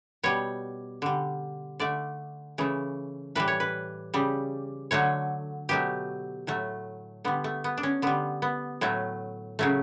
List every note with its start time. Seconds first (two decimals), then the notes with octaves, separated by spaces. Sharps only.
0.23 B2 G3 C#5
1.02 D3 G3
1.80 D3 A3 D5
2.58 C#3 E3 A3
3.35 A2 E3 G3 B4
3.48 C#5
3.60 B4
4.14 C#3 G3
4.91 D3 F#3 A3 C#5
5.69 B2 F#3 A3 G4
6.47 A2 F#3 A3
7.24 D3 G3 B3
7.44 A3
7.64 B3
7.78 D4
7.83 C#4
8.02 D3 G3 B3
8.42 B3
8.81 A2 F#3 A3
9.59 C#3 F#3 A3